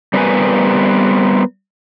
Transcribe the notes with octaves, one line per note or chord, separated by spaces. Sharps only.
G3 B3 C4 A#4 B4 G#5